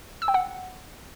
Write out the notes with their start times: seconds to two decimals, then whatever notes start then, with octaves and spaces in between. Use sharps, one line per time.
0.22 E6
0.28 G5
0.34 F#5